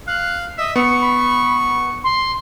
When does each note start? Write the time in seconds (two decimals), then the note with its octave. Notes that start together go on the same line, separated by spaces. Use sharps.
0.07 F5 F#6
0.58 D#5 E5
0.76 B3 C#6 C#7
1.01 B5
2.04 C6